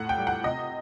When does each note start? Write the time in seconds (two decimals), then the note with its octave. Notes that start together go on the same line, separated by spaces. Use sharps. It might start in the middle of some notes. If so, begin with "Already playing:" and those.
Already playing: A2 F#5
0.09 G5
0.18 G3
0.27 F#5
0.44 C3 D#5